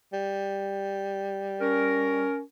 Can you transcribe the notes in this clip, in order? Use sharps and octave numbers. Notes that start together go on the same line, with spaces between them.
G3
C#4 A#4